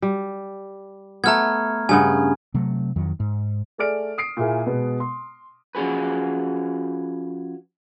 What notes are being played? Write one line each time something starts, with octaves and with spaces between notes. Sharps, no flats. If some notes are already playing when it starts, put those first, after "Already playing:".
G3
A3 B3 A#5 F6 G#6
G2 C#3 B3 G#5
C3 F#3 A3
F2 D#3 F#3
G#2
A3 G#4 D5 F6 D7
D#6 C7 D7
A#2 A#3 E4 G#4
B2 G#3 B3
C6
F3 C#4 F#4 G#4 B4